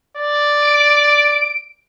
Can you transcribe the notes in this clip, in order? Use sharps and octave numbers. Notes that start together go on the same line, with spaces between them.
D5
D7